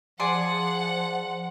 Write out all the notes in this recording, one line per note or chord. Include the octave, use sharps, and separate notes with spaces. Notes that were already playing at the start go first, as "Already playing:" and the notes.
F3 G#4 D5 F#5 C6